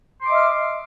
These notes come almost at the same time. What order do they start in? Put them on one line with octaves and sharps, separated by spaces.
C6 D6 D#5 E5 F6